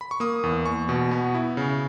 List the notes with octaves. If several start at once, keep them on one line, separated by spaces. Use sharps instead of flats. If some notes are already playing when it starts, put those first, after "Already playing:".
B5
C#6
A#3 D#6
E2
E2 C#6
B2
B3
E4
C#3